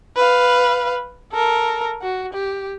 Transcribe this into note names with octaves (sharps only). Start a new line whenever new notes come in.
B4 F5
A4 A#4
F#4
G4